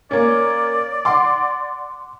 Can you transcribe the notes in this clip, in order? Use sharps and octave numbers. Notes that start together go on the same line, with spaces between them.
A#3 C#4 D5
F#5 C6 D6